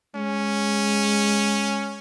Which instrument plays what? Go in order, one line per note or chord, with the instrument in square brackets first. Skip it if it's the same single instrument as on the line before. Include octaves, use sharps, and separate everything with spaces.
[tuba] G#3 [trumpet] C#4